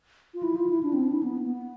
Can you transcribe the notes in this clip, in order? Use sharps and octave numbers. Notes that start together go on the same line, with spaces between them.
F4
E4
F4
E4
D4
C4
D4
E4
B3
B3